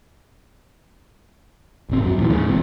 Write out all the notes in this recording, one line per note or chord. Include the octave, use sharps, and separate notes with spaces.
D#1 G#1 C4
F#2 F#3
D#2 A#2 C#3 E3
G#2 C#3
E1 E2 C4